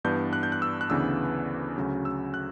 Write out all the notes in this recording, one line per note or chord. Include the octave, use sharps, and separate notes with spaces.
G2 E3 B3 D4 G6
F#6
G6
F#6
E6
F#6
D2 C#3 E3 B3 D4 E6
D2 C#3 F#3 C#4
E6
F#6